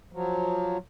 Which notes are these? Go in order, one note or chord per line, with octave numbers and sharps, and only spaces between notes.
F3 F#3